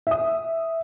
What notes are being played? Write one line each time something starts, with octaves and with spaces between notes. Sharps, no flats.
E5 D#6